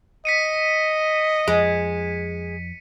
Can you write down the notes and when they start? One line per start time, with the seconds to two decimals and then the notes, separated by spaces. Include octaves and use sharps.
0.25 D#5 B6 C#7 D#7
1.48 F2 G#3